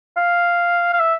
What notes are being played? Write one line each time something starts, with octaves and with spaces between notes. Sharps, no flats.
F5
F5
E5